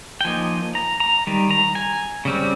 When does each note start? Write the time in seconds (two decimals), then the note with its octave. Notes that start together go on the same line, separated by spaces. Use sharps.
0.21 G5
0.25 F3 A#3 D#4 G#5
0.75 A#5
1.00 A#5
1.27 D#3 G3
1.51 A#5
1.75 G#5
2.25 C#3 G3 C4